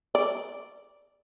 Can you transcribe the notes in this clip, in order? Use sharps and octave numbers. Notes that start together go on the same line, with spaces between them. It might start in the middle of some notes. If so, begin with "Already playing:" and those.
D5